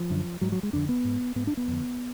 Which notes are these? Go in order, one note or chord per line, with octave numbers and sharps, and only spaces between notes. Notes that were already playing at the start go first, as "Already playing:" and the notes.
Already playing: F3
F#2 D3
G#2 F#3
F#3
G#3
F2 D3 D4
B3
G#2
G#2 B3
D4
B3
F2 D3